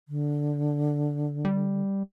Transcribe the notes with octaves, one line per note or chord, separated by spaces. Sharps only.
D3
G3